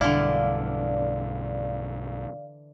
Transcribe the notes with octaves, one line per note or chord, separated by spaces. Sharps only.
B1 G2 D3 E3 E4 D5 F5